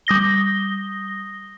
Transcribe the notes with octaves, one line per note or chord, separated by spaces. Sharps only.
G3 D#6 A#6 G7